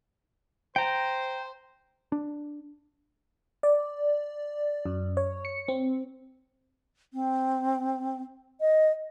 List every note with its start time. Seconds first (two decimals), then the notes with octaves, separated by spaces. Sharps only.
0.76 C5 G5 A#5
2.12 D4
3.63 D5
4.85 F#2
5.17 C#5
5.45 C#7
5.68 C4
7.13 C4
8.61 D#5